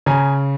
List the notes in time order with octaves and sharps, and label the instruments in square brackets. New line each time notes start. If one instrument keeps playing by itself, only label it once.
[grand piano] C#3 G#5 A#5